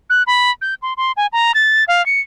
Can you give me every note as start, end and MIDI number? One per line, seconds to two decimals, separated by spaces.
0.10 0.23 90
0.27 0.51 83
0.62 0.75 91
0.82 0.94 84
0.97 1.12 84
1.17 1.27 80
1.33 1.52 82
1.55 1.84 93
1.88 2.04 77
2.06 2.20 97